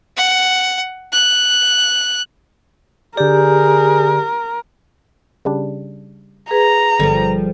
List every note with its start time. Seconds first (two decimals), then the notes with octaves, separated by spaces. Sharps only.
0.17 F#5
1.12 F#6
3.17 D3 G4 G#4 A#4 D5
5.45 C#3 G3 D4
6.51 G#4 B4 A#5
7.00 G1 F3 G3 A4